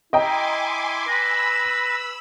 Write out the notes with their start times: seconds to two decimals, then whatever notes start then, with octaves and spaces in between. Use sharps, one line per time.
0.13 E4 D#5 G5 G#5 A#5 C6 D6
1.08 B4 B5 E6 A#6